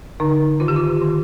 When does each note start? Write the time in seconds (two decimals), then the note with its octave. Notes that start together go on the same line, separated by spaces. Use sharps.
0.20 D3 D#4
0.60 D#3 F4
0.68 G4
0.76 F4
1.01 D#3